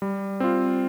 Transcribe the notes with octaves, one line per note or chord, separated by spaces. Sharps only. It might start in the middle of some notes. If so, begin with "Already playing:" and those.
G3
C4 F4